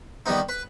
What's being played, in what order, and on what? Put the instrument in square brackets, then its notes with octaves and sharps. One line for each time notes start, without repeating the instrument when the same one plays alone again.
[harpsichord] D#3 G3 B3 D#4
B4